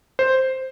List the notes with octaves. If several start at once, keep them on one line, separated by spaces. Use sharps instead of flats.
C5